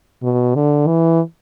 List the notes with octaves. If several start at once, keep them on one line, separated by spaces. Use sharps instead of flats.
B2
D3
E3